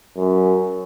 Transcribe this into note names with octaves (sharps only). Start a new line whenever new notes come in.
F#2